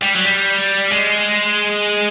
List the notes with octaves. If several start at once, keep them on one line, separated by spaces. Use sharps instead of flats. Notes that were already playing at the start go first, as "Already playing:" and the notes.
G3
F#3
G3
G#3